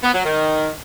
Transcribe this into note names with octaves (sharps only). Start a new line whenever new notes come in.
B3
F#3
D#3